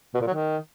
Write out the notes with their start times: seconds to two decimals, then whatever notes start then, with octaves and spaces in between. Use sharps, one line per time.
0.14 B2
0.21 A#2
0.27 F#3
0.34 D#3